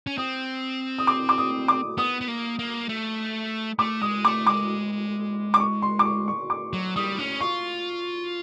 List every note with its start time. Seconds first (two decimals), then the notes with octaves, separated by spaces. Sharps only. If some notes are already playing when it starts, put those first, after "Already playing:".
0.07 C#4
0.18 C4 D#6
0.98 D#6
1.07 D6
1.29 D6
1.38 D#6
1.68 D6
1.98 B3 D#6
2.21 B3
2.28 A#3
2.59 A#3
2.89 A3
3.79 A3 D6
4.01 G#3 D#6
4.24 A3 D6
4.47 G#3 D6
5.54 D6
5.60 C#6
5.82 C6
5.99 D6
6.05 C#6
6.28 C#6
6.50 D6
6.73 F#3
6.96 G3 D#6
7.19 C#4
7.41 F4 C#6